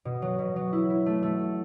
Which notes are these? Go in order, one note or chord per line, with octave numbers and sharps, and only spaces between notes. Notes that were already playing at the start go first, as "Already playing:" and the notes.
B2
F#3
B2
F#3
E4
E4
A3
A3